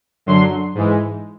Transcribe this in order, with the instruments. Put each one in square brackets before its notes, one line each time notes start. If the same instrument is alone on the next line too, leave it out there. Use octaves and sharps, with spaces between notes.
[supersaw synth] F#2 D3 F#3 C6
G#2 E3 G#3